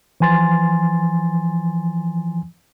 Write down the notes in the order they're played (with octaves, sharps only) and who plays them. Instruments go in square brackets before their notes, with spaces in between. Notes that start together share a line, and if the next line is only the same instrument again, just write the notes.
[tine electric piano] E3 F3 G#5 C6 A6